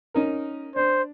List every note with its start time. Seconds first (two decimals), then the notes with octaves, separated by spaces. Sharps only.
0.14 C#4 D#4 A#4
0.76 D4 C5